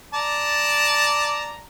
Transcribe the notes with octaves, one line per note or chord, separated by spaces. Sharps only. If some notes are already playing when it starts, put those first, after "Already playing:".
D5 A5 A#5